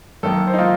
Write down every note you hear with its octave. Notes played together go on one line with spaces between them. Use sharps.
F#2 D#3 A#3 A4
C5
D#4
D#3 A#3 F4